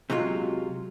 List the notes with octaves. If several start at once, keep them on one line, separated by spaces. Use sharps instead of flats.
C3 F#3 G#3 F4